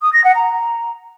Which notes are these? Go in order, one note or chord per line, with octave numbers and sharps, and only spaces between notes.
D#6
A#6
F#5
A#5